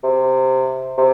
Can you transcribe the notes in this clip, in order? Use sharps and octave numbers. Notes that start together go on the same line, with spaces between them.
C3
C3